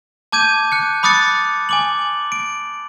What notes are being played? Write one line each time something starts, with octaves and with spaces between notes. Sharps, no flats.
A5 D6 G6 G#6 D#7
F#6 C#7
B5 D6 D#6 F#6 A6 C#7
G#5 D6 F#7
D7